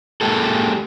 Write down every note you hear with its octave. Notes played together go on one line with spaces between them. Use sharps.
G#3 A#3 G4 A4